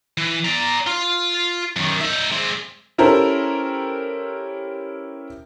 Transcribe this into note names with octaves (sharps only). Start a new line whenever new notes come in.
E3
D5 A#5
F4
F#2 D#3
D#4 E5
G#3 C4
C#4 E4 G4 A4 A#4 C5